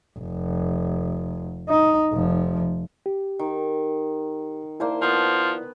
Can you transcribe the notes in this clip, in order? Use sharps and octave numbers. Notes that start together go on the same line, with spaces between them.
F1
D#4
F1 F3
G4
D#3
A#3 E4 C5 D5 A5
F3 B3 A5